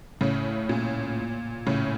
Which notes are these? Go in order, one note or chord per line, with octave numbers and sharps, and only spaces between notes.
A2 C#3
A#2
A2 C#3